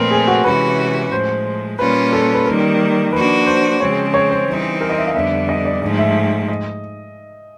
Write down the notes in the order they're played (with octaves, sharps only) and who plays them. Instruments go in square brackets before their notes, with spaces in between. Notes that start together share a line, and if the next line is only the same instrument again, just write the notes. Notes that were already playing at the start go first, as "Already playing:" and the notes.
Already playing: [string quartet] A#2 F3 A3 C4 [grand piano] A#4 B4
[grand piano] G#4
F#4
[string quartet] C3 E3 G#3 C#4 F#4 [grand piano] B4
[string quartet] A2 F3 G#3 [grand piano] C5
[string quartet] A#2 G3 A#3 C#4 F4 [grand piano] B4
[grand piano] A4
B4
[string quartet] D#3 G3 A#3 [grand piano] A#4
[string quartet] F3 A#3 D4 F#4 [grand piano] B4
[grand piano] C5
[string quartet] C#3 F3 G#3 C4 [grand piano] C#5
[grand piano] C#5
C5
[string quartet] E3 G3 C4 D#4
[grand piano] A#4
D#5
E5
F5
[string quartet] F2 D3 G3 B3 [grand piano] E5
[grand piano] D#5
D5
[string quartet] G#2 F3 A3 [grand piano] D#5
[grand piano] E5
D#5